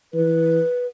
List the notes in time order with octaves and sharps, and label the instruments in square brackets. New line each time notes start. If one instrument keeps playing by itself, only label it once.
[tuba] E3 [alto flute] B4